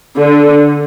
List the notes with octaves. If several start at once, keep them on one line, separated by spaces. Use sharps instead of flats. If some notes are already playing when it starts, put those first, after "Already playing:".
D3